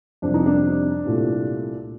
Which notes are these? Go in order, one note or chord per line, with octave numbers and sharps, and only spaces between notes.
F2 C3 G3 D4
D#4
D4
C2 A#2 A3